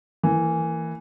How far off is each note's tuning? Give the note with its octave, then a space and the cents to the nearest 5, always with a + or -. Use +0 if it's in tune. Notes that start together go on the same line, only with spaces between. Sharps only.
E3 +0 A#3 -25